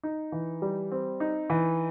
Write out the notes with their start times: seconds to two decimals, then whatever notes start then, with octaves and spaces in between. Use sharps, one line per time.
0.03 D#4
0.32 E3
0.62 G3
0.92 C4
1.20 D#4
1.50 E3